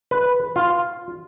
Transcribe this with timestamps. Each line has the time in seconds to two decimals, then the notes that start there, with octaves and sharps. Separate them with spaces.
0.11 B4
0.56 F4